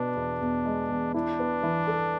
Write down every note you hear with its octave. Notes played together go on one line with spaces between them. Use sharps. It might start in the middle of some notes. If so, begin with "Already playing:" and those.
Already playing: B2 B3 D4
E2
E2
G#3
E2
D4 E4
B3
E3
A4